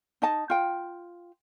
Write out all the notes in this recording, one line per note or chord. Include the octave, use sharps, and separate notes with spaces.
D#4 D#5 A5
F4 G5